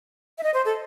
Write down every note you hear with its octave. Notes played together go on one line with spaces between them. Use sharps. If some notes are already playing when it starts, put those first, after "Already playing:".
E5
D#5
C5
A4